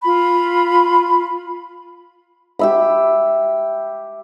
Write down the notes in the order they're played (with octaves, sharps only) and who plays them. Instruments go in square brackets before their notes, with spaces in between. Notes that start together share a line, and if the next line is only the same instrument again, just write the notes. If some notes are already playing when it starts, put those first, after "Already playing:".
[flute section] F4 B5
[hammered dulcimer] G4 E5 B5